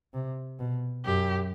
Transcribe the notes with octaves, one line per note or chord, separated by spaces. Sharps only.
C3
B2
F#2 G4